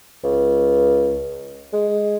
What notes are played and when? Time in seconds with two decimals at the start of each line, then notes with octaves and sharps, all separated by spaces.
0.24 C#2
1.73 G#3